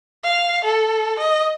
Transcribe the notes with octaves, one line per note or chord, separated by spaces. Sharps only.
F5
A4
D#5